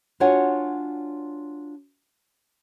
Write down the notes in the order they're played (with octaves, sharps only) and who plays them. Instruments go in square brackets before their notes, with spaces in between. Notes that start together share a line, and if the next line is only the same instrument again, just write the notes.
[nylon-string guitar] D4 F4 F#4 C#5 F#5 G#5